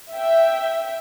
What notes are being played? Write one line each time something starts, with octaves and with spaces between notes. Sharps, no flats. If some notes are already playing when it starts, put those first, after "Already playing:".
E5 G5